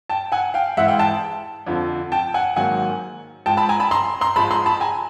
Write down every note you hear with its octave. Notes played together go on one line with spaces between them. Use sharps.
G5 A5
F#5 G#5
F5 G5
G#2 E3 G#3 E5 F#5
F5 G5
G5 A5
F2 D3 F3
G5 A5
F#5 G#5
G#2 D#3 F#3 A#3 F#5 G#5
G#2 F3 G#3 G5 A5
A5 B5
G#5 A#5
A5 B5
A#5 C6
A#5 C6
G#2 F3 G#3 A5 B5
A#5 C6
A5 B5
G#5 A#5